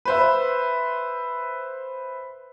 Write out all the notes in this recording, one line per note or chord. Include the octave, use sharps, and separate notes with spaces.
B4 C5 E5